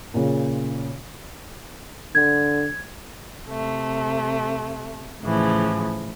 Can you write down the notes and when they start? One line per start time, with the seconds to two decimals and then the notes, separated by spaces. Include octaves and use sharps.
0.14 A#2 C#3
2.15 D3 G#6
3.48 C3 A3
5.22 A2 C#3 E3 F3